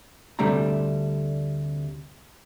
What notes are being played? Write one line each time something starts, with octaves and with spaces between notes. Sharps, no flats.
D2 C3 G3 A3 D4 A#5